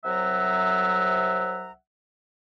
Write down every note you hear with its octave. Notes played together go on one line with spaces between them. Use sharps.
C2 C3 F#3 E5 F#5 A#5